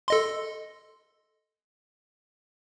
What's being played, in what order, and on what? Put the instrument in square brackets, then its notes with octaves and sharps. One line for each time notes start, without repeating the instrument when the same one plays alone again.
[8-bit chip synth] A4 D#5 C6